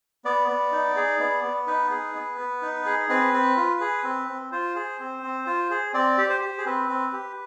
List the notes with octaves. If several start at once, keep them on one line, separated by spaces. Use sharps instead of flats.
B3 D5
B3
D#4
G#4
B3
B3
D#4 B4
G#4
B3
B3
D#4
G#4
C4 B4
C4
F4
G#4
C4
C4
F4 C5
G#4
C4
C4
F4
G#4
C4 D5
G4
C5
G4
G#4
C4 B4
C4
G4